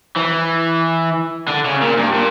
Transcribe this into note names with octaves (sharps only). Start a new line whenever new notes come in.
E3
D3
C#3
A#2
G2
A#2